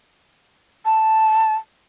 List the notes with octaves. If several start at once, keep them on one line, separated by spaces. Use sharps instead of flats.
A5